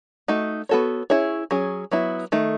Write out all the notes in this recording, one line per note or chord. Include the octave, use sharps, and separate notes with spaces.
A3 D#4 F#4
B3 F#4 A4 C#5
C#4 E4 G#4 C#5
F#3 C#4 G#4
F#3 B3 E4
D#3 A3